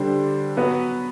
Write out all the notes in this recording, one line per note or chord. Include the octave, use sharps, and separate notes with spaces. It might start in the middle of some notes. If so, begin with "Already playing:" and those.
Already playing: D3 G3 D4 G4 C5
F#3 B3 F#4 B4